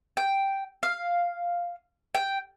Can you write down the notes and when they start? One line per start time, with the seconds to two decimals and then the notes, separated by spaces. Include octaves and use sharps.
0.17 G5
0.83 F5
2.15 G5